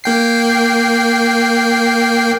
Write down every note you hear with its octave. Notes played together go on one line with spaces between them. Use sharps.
A#3 G5 C7